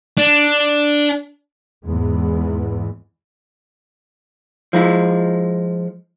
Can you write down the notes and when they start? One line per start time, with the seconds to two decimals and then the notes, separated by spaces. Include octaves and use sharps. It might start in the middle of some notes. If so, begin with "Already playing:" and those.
0.18 D4
1.87 E2 G#2 E3 G#3 B3
4.73 F3 G#3 E4